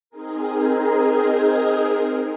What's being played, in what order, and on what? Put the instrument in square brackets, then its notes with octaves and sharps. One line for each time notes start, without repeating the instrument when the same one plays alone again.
[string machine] C4 D#4 G#4 A#4